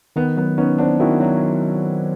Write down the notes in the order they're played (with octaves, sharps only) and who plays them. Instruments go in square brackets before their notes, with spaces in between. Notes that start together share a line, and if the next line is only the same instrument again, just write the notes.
[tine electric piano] D#3 [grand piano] B3
[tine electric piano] F#3 [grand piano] B3
[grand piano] B3 C#4 [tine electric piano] D#4
[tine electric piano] B3 [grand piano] C4 D4
[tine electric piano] D#3 [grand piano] E4 F#4
[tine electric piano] F#3